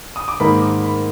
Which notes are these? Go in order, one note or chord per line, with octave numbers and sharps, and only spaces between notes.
D#6
D6
G#2 D#3 A#3 D#4 B5
D6
B5